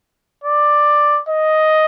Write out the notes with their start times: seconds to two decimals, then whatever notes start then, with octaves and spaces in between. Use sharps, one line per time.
0.44 D5
1.29 D#5